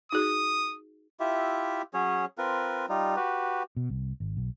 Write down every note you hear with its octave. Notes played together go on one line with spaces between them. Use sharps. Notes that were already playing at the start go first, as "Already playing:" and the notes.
D#4 F#4 G#4 D#6
E4 F4 G4 E5
F#3 C#4 G#4 C#5
C4 F4 A#4 B4
G3 D#4 F4
F#4 G4 B4
B2
C2
G#1
B1